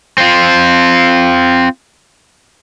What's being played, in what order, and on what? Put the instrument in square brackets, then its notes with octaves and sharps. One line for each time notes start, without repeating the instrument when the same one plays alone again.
[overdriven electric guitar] C4 F4